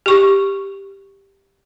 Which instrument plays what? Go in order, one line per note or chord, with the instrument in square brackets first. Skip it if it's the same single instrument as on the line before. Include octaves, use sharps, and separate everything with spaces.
[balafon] G4 C#6